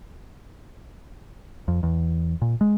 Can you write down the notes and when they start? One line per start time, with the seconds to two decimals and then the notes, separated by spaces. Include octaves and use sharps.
1.68 F2
1.83 E2
2.42 A#2
2.61 G#3